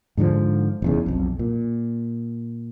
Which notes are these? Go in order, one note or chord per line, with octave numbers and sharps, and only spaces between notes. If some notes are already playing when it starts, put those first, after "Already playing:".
G#2 D3 E3 F3
F1 E2 C#3
B1 F2
A#2